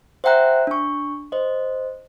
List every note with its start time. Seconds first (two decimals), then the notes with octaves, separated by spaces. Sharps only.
0.24 C5 E5 F#5 G5 A#5 F#6
0.67 D4 C#6
1.32 C5 D#5